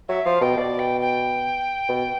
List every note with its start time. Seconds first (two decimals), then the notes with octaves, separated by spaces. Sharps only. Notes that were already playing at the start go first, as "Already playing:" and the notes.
0.09 F#3 E5
0.25 F3 F5
0.41 B2 G5
0.57 B2 D5
0.79 G5
1.01 G5
1.89 B2